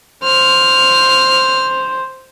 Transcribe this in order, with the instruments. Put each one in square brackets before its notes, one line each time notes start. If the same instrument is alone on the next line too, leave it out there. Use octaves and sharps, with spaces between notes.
[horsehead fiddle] C5 [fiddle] F6